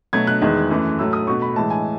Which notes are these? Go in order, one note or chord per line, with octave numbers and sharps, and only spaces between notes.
B2 F#3 A3 G#6
F#6
E2 D#3 G#3
F#2 E3 A3
A2 F#3 A3 E6
D#6
B2 A3 C#6
B5
A2 E3 G#3 A5
G#5